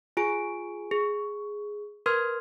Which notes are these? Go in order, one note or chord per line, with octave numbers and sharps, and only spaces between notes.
F4 G#4 G#5 D7
G#4
A#4 B4 C6 F6 G#6